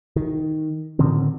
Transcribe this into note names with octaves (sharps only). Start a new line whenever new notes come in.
D#3
A2 D3 D#3 C4